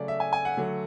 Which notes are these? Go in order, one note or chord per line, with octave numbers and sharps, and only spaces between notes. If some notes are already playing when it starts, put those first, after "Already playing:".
Already playing: C#3 F#3 A3 D5
E5
G#5
G#5
F#5
D3 F#3 A3